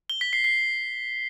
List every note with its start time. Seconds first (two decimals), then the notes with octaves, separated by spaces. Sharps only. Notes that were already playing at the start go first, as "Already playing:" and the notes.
0.10 G7
0.21 B6
0.33 C7
0.44 C7